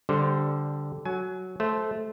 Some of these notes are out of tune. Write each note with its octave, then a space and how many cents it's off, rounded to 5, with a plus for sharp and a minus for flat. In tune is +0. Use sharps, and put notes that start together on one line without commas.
D3 -10 G3 +0 C5 +0
F#3 +0 G#5 +25
A3 -15 C5 +0